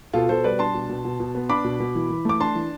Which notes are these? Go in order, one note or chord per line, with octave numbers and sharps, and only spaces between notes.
B2 F4 A4
B2 A4 C5
G3 B4 D5
D4 A5 C6
B2
B2
B2
B2
B3
D4 B5 D6
B2
B2
E3
E3
A3 D6
D4 A5 C6
E3